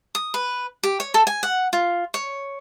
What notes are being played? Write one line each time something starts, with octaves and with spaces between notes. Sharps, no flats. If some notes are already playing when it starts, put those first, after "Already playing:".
D#6
B4
G4
C#5
A4
G#5
F#5
F4
C#5